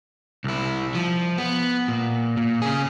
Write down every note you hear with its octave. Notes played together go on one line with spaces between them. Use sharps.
C2 E4
F3
B3
A#2
A#2
C#3 G#4